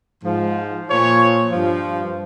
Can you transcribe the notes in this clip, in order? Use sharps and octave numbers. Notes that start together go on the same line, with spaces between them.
G#2 F3
A#2 F3 C#5
G2 F3